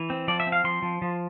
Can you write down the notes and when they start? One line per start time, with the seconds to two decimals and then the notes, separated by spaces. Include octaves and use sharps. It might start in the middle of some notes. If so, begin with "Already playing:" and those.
Already playing: E3
0.10 C4
0.28 F3 D5
0.40 E5
0.47 C4
0.52 F5
0.64 F3 C6
0.82 F3
1.02 F3